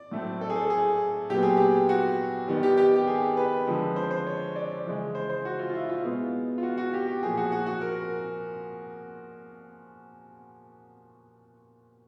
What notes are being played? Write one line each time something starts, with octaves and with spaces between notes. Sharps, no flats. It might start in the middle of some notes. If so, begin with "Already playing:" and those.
Already playing: D5
A2 F#3 A3 C4
A4
G#4
A4
G#4
A#2 F#3 B3 G4
G#4
G4
F#4
D#3 G3 B3
G4
G4
G4
G#4
B4
D3 F3 G#3 C4
C5
C5
C#5
D5
C#3 E3 G#3
C5
C5
F#4
F4
F4
E4
F4
B2 G#3 B3
F4
F#4
F#4
G4
G4
A#2 F3 A#3 G#4
F#4
F#4
F#4
A#4